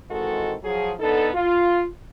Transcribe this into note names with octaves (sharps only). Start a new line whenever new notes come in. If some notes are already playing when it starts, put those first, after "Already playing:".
D#3 E3 G#3 C4 F#4 A4
F3 F#3 G#4
D3 B3 D#4 A4
F4